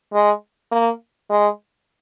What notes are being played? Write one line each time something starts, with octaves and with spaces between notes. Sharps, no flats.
G#3
A#3
G#3